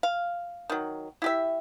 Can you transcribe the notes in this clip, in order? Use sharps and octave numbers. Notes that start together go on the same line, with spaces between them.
F5
D#3 F#3
E4 G4 E5